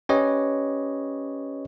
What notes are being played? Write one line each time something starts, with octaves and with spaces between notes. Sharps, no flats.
C#4 G4 B4 C#5 D#5